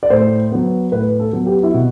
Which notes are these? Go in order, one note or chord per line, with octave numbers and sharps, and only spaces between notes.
D5
A2 C5
F#3 B3
A2 B4
A4
F#3 B3
G4
E4
B2 F#4